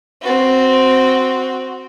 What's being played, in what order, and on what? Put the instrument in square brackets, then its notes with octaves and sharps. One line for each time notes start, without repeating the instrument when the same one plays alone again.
[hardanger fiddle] C4 F#4